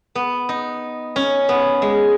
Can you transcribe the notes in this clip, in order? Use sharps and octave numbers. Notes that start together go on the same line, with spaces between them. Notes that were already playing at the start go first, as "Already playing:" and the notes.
B3
D#4
C#4
B3
G#3